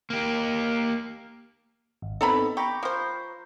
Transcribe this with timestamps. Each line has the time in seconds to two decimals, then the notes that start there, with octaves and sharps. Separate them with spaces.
0.10 A#3 G4
2.02 G#1
2.21 B3 C4 D#4 A4 A#5 B5
2.57 G4 A#5 B5 C#6
2.83 F3 C5